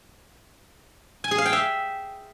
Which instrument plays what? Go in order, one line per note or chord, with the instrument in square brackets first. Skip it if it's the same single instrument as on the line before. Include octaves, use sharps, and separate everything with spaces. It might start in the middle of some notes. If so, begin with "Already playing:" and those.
[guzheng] G#5
G#4
F5
G5
E5